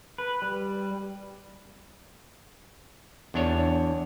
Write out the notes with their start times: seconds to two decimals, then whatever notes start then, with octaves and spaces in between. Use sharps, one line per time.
0.18 B4
0.42 G3
3.34 E2 D4 C#5